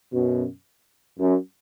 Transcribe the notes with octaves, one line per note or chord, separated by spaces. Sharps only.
F#2 B2
F#2